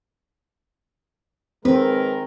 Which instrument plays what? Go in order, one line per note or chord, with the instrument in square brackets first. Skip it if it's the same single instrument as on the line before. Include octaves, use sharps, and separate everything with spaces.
[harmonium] D#3 [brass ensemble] G#3 G#4 A#4 [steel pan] C4 [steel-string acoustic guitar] B4